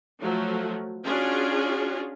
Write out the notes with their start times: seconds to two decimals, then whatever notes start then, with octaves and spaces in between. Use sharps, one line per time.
0.20 F3 F#3 A3
1.05 C#4 D4 F4 F#4 G#4